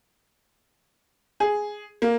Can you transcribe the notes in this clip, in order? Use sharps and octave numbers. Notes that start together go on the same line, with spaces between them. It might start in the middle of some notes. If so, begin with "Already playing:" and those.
G#4
A#3